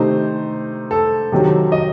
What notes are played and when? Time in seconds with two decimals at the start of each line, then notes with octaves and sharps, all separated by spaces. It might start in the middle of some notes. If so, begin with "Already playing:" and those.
Already playing: C3 D#3 A3 D#4 C5
0.91 A4
1.32 C3 D#3 F#3
1.72 D#5